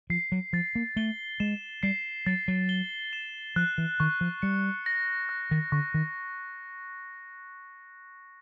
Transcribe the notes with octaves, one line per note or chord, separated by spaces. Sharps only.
F3 C7
F#3
F3 A6
A#3
A3 G7
G#3 E7
G3 C7
F#3 A6
F#3
G7
E7
F3 F#6
E3
D#3 C#6
F3
G3 C#7
A#6
F#6
D#3
D3 C#6
D#3